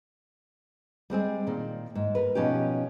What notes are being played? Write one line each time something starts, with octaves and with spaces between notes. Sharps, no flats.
G3 G#3 C4 G#4
A#2 D#3
G#2
A#4 B4
B2 F3 C#4 D#4 G4